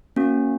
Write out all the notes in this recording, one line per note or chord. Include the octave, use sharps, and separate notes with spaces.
A#3 C#4 F#4